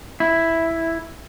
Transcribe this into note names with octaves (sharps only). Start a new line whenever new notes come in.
E4